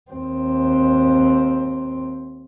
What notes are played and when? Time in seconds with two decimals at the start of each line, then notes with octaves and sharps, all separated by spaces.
0.12 D#2 C4